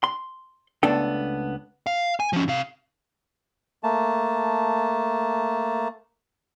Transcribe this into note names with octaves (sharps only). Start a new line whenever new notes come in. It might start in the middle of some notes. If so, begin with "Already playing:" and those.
C6
C#2 A3 B3 D4 A4 G5
F5
G#5
F3 C#4
C3 F5
A3 A#3 A5